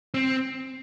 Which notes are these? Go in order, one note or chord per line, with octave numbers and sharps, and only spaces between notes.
C4